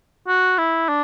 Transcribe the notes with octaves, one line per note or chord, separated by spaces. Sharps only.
F#4
E4
D4